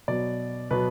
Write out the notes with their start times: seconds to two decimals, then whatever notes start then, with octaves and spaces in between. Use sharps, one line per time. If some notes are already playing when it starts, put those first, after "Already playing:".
0.08 B2 F#3 B3 D5
0.71 B2 F#3 B3 B4